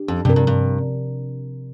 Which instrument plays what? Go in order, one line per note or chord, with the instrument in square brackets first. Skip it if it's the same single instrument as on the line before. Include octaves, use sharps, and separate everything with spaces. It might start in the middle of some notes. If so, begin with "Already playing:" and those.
Already playing: [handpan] D4 G4
[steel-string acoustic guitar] F2
[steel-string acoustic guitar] G2 [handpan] C3 F3 C4 A#4
[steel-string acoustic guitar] G2
G2